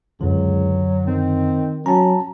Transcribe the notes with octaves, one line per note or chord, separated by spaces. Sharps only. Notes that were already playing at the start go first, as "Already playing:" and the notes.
C#2 F#2 D3 F#3
D#3 C4
F#3 C#4 A5 A#5